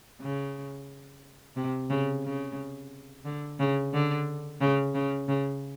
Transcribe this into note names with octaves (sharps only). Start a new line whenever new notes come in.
C#3
C3
C#3
C#3
D3
C#3
D3
C#3
C#3
C#3